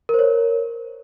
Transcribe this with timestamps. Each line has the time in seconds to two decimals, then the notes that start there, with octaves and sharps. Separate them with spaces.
0.09 A#4
0.14 C5
0.19 C#5